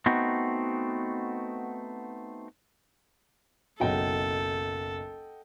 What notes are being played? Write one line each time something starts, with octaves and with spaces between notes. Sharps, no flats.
A3 B3 C4 D#4 F#4
F#1 B1 F#3 A4 D#5 F#5 G5